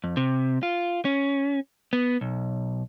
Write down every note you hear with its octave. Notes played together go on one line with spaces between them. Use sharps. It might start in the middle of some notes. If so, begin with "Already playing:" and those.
F2
C3
F4
C#4
B3
B1